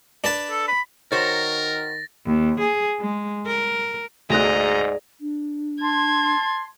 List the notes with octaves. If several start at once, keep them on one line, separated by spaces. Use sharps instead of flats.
D4 B4 A5
A4
B5
D#3 F#4 A#4 C5 C#5 A6 A#6
D#2
G#4
G#3
A#4
D2 G#2 A3 G#4 D5 D#5 A#5 F#6
D4
A5 C6 G#6